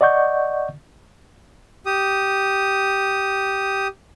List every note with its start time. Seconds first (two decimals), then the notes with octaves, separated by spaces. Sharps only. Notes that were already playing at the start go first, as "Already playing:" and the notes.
0.01 D5 D#5 F#5 C#6 G6
1.86 G4 D#6